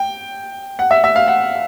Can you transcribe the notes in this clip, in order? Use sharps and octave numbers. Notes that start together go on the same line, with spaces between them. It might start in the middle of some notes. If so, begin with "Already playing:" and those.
Already playing: G5
F#5
E5
E5
F5
F#5